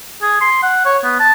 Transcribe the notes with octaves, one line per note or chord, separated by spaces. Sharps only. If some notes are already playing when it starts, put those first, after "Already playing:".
G#4
C6
F#5
C#5
B3
A5